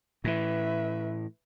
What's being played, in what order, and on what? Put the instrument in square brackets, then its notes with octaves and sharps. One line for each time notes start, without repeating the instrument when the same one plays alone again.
[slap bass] A2 E3 [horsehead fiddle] B4 E5